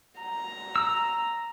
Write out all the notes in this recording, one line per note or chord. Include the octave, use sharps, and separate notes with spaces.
A#5
E6